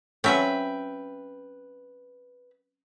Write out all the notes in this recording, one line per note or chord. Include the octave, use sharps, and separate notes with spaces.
F#3 C4 C#4 B4 E5 G5